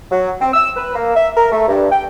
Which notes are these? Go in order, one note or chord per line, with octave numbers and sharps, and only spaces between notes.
F#3
C4
E6
B4
A#3
E5
A#4
A3
G2
G5